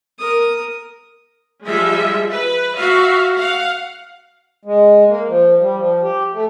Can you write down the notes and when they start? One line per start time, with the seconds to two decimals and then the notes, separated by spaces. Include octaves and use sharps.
0.19 A#4 D#6
1.65 F3 G3 G#3 E5
2.31 B4
2.76 F#4 E5 F5
3.34 F5 F#5
4.65 G#3
5.08 A#3
5.28 F3
5.60 G3
5.77 F3
6.03 G4
6.33 A3